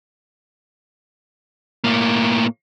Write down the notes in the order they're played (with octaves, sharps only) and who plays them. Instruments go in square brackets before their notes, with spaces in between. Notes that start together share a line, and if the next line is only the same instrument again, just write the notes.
[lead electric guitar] A2 A#3